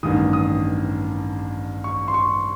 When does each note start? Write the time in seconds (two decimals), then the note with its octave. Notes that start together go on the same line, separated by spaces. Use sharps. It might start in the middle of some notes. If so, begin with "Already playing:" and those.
0.03 A1 G2 D#3 D#6
0.33 D#6
1.84 C#6
2.08 C6
2.14 C#6